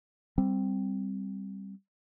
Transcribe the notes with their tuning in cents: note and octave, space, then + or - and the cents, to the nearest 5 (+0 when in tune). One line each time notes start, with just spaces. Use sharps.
G3 +0 C4 +0